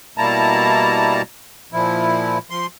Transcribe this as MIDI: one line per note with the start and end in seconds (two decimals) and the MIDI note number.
0.18 1.22 47
0.18 1.22 55
0.18 1.22 58
0.18 1.22 64
0.18 1.22 81
0.18 1.22 82
1.72 2.38 46
1.72 2.38 53
1.72 2.38 64
2.50 2.66 53
2.50 2.66 84